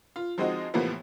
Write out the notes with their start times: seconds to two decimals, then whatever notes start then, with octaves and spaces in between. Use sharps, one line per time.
0.16 F4
0.38 F3 G#3 C4 D#4 F#4 D#5
0.74 A2 C3 E3 F3 A#3 B3